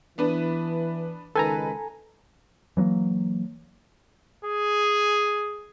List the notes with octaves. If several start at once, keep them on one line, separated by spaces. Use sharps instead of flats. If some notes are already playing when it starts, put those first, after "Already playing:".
E3 B3 D4 B4
C#2 D#3 A4 B4 G#5 A#5
E3 F#3 G#3 A#3
G#4